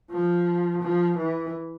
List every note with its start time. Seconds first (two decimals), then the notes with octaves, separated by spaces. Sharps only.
0.11 F3
0.82 F3
1.18 E3